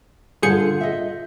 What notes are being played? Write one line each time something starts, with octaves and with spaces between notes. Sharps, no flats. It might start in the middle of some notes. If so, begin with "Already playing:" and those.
G2 D3 F4 G#4 F#5 A5 G6 C#7
D#5 E5